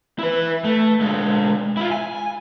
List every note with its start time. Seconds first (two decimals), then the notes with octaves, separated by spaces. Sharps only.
0.19 E4 B4
0.64 A3
1.01 D3 G#3
1.77 E4 F4
1.91 G#5